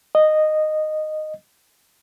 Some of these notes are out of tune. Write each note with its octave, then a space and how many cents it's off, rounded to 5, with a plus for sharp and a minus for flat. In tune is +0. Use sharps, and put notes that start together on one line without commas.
D#5 -10